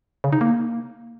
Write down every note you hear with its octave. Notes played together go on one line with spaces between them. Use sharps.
C#3
D#4
A#3